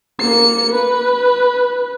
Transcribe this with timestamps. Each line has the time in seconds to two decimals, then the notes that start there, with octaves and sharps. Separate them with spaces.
0.21 A#3 C#7
0.71 B4